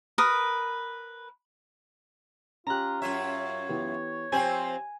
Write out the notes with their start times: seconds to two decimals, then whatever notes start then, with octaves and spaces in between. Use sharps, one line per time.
0.18 A#4 B4 D#6
2.67 C#4 F4 G4 A#5 F#6
3.02 F#2 F4 C#5 E5
3.69 E3 B3 G4
4.32 F3 C4 G4 C5 G5 G#5